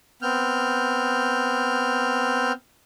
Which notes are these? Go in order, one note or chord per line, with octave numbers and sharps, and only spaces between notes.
B3 C4 F6 G6